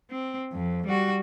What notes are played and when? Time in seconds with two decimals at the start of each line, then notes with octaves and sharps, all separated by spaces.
0.11 C4
0.52 F2
0.87 G3 F#4